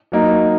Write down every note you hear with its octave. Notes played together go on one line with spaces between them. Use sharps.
F#3 A#3 D#4